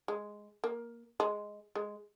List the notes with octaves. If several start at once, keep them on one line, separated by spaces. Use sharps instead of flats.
G#3
A#3
G#3
G#3